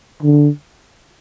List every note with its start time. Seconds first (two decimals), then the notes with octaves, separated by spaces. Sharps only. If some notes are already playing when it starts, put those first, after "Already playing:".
0.23 D3